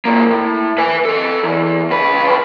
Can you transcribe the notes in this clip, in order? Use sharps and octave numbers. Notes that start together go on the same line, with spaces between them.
G#2 A#3
A2
B4 G#5
A4 D#5
E2
C#2 B4